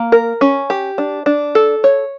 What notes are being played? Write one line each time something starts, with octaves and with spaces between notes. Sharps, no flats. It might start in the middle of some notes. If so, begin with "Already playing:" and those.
Already playing: A#3
A#4
C#4
G4
D4
D4
A4
C#5